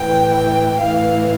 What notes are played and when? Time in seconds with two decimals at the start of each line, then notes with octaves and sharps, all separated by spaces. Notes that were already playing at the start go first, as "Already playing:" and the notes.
Already playing: A2 E3 G5
0.33 G5
0.79 A2 E3 F5